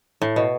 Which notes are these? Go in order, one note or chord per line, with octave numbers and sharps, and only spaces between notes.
A2
B2